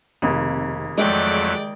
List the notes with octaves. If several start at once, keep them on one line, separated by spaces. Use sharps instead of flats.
F1 D#2 C#3 C4
F2 F#3 G#3 A3 D5 G5